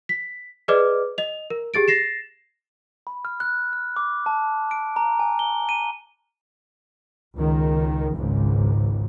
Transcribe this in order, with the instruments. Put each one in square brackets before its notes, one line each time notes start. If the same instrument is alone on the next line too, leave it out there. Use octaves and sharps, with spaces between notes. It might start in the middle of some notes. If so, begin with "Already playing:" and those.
[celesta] B6
G#4 B4 D5 D#5 D6 F6
D#5 F7
A#4
G4 G#4 A6 D7
A6 A#6 C7 E7
[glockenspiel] B5
F6
F#6
F6
D6
A5
D7
A#5
G#5
G7
D#7
[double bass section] C#2 D#3
G#1 C#2 G#2